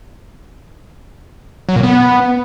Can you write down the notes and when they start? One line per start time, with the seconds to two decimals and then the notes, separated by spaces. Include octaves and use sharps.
1.69 F#3
1.76 A#2
1.83 B3